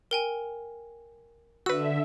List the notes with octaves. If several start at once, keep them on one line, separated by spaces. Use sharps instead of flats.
A#4 G5 G#5
D3 F#4 B4 E5 E6